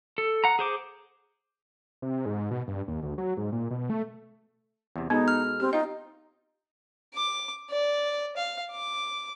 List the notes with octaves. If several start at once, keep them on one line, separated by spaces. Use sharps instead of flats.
A4
F#5 A#5
G#4 C5 D6
C3
G#2
B2
G2
D#2
D2
F#3
G#2
A#2
B2
A3
E2 C3
B2 G#3 B3 D#4 A4
F6
C4 G4
D#4 F4 D#5 G5
D6
D5
F5
D6